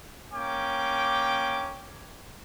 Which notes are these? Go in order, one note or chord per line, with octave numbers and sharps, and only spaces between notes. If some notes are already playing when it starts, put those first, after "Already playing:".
A#3 C#4 G5 D6